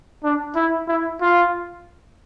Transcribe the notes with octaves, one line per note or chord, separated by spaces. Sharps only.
D4
E4
E4
F4